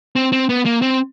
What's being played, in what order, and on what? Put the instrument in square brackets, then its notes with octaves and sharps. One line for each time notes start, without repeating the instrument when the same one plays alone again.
[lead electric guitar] C4
C4
B3
A#3
C4